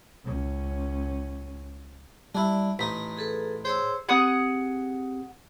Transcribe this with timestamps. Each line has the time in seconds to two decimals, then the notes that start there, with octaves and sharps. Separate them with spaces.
0.24 C#2 C#4
2.35 G3 D4 E4
2.79 A1 D#4 B6
3.17 G#4 A4 B4
3.65 G#4 C5 C#5 E6
4.09 C4 G4 G#4 F#5 D#6